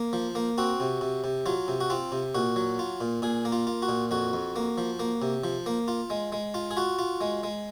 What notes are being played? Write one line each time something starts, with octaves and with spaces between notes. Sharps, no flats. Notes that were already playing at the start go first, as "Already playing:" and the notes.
Already playing: A#3
F3
A#3
C4 F#4
C3
C3
C3
F#3 F4
C3
F#4
C4 F4
C3
A#2 F#4
F#3
F4
A#2
A#2 G#4
A#3
F4
F4
F#4
A#2
F2 F#4
F2
A#3
F3
A#3
C3
F3
A#3
F4
G#3
G#3
F4
G#4
F4 F#4
F4
G#3
G#3